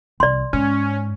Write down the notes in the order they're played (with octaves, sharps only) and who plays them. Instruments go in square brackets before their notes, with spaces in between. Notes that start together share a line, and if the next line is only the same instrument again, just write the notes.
[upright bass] C2 [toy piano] D5 C6
[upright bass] G#2 [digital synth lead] C#4